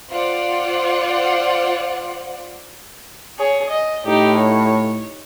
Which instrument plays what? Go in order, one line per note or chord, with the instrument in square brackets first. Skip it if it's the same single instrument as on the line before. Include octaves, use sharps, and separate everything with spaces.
[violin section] F4 C5 D5 F#5
[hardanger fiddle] G#4 C#5
D#5
[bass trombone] A2 [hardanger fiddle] D#4 G4
[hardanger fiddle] C#5